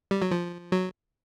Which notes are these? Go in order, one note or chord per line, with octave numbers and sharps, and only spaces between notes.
G3
F#3
F3
F#3